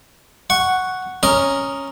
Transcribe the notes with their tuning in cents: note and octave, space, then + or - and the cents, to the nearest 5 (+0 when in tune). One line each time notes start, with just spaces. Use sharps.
F#5 +0 C#6 +0
C#4 -5 A#4 +0 D#6 +0